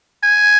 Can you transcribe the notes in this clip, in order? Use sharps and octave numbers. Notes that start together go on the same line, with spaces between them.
G#5